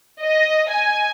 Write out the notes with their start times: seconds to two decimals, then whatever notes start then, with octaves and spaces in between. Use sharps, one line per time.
0.23 D#5
0.69 G#5